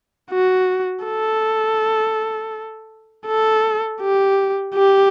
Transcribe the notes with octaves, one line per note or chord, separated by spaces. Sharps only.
F#4
A4
A4
G4
G4